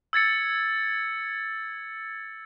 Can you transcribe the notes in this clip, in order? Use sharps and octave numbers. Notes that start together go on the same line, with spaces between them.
E6 G#6 A6 C#7